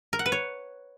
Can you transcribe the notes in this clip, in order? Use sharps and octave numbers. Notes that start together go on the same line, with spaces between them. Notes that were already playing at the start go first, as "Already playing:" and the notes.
A#4
F#5
B4
C#5